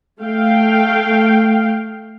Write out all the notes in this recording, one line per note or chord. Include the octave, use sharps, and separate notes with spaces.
A3 F5 G5